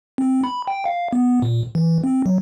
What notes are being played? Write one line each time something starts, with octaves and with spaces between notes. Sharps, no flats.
C4
B5
G5
F5
B3
A#2
E3
C4
F#3